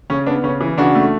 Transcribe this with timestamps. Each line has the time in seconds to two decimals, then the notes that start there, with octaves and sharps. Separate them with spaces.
0.10 C#3 C#4
0.26 B3 D4
0.44 C#3 C#4
0.61 E3
0.78 C#3 D4 F#4
0.95 A3